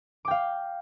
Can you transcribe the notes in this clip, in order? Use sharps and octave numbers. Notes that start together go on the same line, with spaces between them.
F5 G5 D6